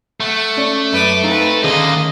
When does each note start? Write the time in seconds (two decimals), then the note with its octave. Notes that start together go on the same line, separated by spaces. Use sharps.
0.20 A3 F#5
0.57 C#4 C#5 D5
0.93 F#2 B4 D6
1.24 C4 D#4 B4 E5 F5
1.64 D3 D#3 A#3 C#4 G#4 D#5